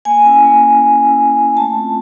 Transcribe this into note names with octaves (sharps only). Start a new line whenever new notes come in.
A#3 G#5
C#4 E4
A#3
C#4 E4
A#3
C#4 E4
A#3
C#4 E4
A3 A5
C4 F4